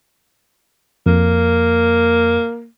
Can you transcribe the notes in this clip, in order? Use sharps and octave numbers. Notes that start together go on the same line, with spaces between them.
F2 A#3